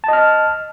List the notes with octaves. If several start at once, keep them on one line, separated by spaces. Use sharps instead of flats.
D#5 A5 F6